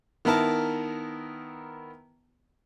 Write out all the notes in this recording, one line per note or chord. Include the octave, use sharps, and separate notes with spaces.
D#3 B3 E4 A#4 A5